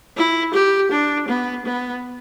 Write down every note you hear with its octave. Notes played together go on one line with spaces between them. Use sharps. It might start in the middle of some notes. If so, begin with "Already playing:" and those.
E4
G4
D4
B3
B3